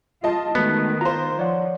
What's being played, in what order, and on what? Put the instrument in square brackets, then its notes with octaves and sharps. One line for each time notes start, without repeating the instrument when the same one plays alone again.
[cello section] F4 [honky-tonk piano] D#5 A5
[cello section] D#3 [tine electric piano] G#3 A3 F#4 [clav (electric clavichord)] B3
[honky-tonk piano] F4 C5 [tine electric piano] A#5
[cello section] F3 [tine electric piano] C#5 D5 F#5